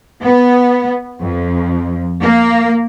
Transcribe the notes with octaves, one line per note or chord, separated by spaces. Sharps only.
B3
F2
A#3